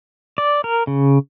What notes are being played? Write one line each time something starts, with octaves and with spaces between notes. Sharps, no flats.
D5
A#4
C#3